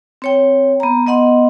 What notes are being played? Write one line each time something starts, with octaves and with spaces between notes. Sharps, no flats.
C4 C#5 G5
B3 A#5
B3 D#5 F#5 C6